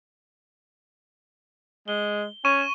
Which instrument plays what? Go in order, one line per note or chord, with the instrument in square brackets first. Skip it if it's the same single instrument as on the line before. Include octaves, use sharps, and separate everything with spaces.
[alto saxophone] G#3 [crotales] G7
[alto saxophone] C#4 [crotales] C#6 D#7